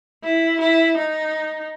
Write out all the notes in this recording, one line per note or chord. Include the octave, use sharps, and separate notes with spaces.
E4
E4
D#4